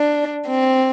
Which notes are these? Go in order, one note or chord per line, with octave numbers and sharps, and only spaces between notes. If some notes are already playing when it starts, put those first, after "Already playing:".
Already playing: D4
C4